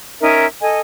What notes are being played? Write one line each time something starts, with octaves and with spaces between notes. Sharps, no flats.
C#4 D#4 A#4 E5
A4 D#5 G#5